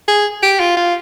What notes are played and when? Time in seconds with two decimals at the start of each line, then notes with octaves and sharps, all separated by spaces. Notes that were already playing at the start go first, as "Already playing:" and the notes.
0.08 G#4
0.43 G4
0.60 F4
0.77 F4